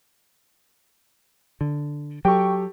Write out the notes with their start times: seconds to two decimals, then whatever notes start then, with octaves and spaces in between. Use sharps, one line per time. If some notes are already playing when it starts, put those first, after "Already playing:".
1.61 D3
2.25 F#3 G4 A4 G5 C#6